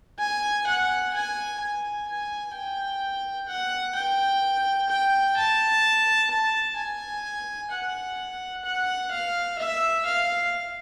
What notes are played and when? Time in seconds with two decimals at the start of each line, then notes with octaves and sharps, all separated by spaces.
0.19 G#5
0.67 F#5
1.13 G#5
1.60 G#5
2.08 G#5
2.55 G5
3.48 F#5
3.95 G5
4.89 G5
5.37 A5
6.30 A5
6.76 G#5
7.71 F#5
8.65 F#5
9.11 F5
9.58 E5
10.06 F5